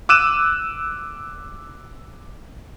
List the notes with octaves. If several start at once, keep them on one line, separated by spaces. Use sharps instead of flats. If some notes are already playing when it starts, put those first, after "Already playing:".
D6 E6 F#6 D#7 E7